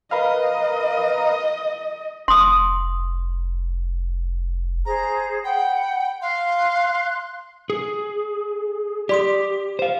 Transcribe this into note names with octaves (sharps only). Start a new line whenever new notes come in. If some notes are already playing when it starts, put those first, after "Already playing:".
A#4 B4 D#5 F5
F1 C6 D#6
G#4 C5 A#5
F#5 G5 B5
F5 C6 F#6
G#4
G4 D5 C6 D#6
C5 F5